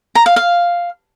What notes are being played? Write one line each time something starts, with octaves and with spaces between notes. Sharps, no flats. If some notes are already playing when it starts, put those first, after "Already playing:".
A#5
F5
F5